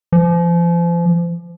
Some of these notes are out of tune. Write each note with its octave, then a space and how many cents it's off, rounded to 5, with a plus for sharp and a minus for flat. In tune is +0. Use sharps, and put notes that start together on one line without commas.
F3 -35